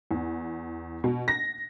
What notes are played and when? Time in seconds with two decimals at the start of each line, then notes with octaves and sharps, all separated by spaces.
0.11 E2
1.04 B2
1.28 A#6